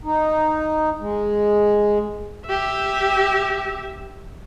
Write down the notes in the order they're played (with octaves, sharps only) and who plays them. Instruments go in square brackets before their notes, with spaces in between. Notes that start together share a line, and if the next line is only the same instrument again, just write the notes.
[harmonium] D#4
G#3
[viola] G4 E5